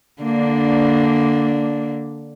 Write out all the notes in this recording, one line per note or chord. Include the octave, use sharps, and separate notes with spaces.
D3 A#3 D4